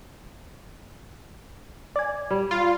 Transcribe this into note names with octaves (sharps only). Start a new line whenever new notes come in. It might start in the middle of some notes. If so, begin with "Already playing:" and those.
D5 G#5
G3
F4